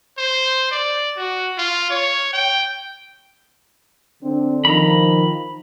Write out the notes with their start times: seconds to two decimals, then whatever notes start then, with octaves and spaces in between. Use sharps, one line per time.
0.18 C5
0.71 D5
1.17 F#4
1.58 F4
1.90 C#5
2.33 G5
4.23 D3 C4 D4
4.65 D#3 F3 A#5 B5